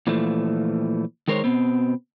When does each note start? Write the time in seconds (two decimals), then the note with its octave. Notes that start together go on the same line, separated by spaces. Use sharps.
0.07 A#2 E3 F3 A3
1.28 D#3 G#3 A#4 C5 C#5
1.44 B2 B3 C4